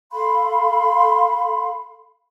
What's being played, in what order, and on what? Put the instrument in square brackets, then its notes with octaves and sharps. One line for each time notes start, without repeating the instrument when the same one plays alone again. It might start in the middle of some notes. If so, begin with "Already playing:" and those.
[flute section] A4 F5 B5 C6